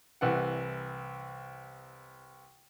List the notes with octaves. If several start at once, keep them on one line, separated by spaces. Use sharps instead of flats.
C2 E3 F#5